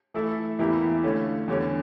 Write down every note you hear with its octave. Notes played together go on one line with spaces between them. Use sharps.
E3 A3 E4 A4 E5
E2 E3 A#3 E4 G4
D3 A3 C#4 F4
E2 D3 G3 C#4